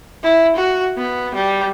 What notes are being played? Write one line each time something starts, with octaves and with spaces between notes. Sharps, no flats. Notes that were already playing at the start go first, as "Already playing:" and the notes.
E4
F#4
B3
G3